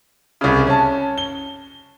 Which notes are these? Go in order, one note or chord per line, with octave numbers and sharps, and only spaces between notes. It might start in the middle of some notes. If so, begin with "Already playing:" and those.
C2 C#3
C#4 A5
G7